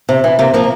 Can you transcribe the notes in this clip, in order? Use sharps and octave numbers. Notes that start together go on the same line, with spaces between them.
C3
E3
C3 A#3
F3 A#3